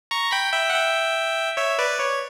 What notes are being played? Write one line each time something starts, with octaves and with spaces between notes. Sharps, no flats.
A#5 C#6
G5 B5
E5 G5
F#5
E5 G5
C#5 E5
B4 D5
C#5